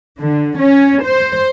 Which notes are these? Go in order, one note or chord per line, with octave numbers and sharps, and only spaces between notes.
D3
C#4
C5